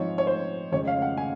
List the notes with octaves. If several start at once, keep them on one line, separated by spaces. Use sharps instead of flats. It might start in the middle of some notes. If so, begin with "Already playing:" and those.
Already playing: G#2 F3 C4 D#4 C#5
C#5
C5
F2 C#3 G#3 C4 C#5
F5
F#5
G#5